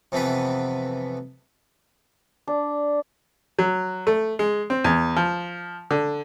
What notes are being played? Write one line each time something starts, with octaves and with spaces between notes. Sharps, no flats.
F2 C3 E3 A3 B3 B4
D4
F#3
A3
G#3
C4
E2
F3
D3